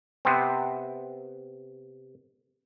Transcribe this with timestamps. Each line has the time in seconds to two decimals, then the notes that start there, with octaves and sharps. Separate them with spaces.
0.25 C3 B3 C4